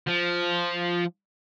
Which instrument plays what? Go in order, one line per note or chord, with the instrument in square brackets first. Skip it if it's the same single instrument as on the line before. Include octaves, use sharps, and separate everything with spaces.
[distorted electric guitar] F3